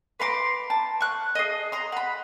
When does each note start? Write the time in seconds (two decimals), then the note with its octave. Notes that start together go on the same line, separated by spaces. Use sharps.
0.20 B4 A#5 C6 D6
0.70 A5
1.01 C#6 F#6
1.35 G#4 D#5
1.72 A#5 C6
1.92 F#5 B5